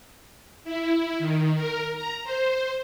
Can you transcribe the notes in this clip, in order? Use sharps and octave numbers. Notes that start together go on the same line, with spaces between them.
E4
D#3
A#4
A#5
C5